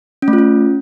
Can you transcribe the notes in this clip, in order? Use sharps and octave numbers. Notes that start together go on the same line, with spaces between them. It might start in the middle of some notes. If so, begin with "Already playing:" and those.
C#4
A3
F4
C#4